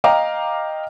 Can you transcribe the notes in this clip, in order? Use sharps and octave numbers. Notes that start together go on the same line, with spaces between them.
D#5 F5 G5 A#5 D6